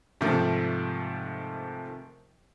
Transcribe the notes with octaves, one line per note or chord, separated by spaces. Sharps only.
G#2 C3 D#3 F3 A3